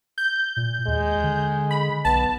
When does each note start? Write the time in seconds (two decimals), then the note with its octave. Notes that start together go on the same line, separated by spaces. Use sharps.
0.18 G6
0.57 A#2
0.88 D#2 G#3
1.23 D3
1.71 B5
2.05 B1 B3 A5